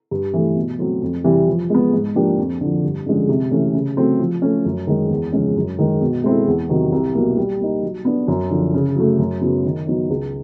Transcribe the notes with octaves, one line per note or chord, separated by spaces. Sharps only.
G2
E3 A3
B2
F#3 A3 C4
F2
C3 E3 G3
F3
G#3 B3
G#2
F3 A#3 D4 G4
F2
D3 F3
G2
D3 F3 G#3 C#4
C3
E3 A3 C#4
C#3
F#3 A3 C4
F3
A3 C#4
F#2
D#3 G#3
E2
C#3 F3 G#3 C#4
F#2
D#3 G#3
B2
G#3 C4 E4 A4
E2
C3 D#3 F#3
C2
B2 F#3 A#3
G3
A#3 D#4
F#3
B3 D4
F#2
D3 F3
C#3
F#3 A3
F#2
C#3 F#3 B3
D#3
F#3 B3 D#4
C#2